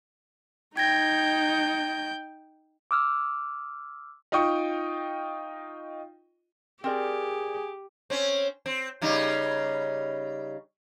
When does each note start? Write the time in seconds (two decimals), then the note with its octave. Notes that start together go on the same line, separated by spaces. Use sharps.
0.77 D#4 G5 G6 G#6 A#6
2.91 D6 E6 F6
4.32 D#4 F4 D#5 G5 C#6
6.84 C4 G4 G#4 A#4 D5
8.10 C4 C#4
8.66 C4
9.02 C#3 G3 D#4